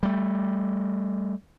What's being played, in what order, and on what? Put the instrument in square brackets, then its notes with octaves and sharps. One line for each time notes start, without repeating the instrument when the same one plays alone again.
[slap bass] G3 A3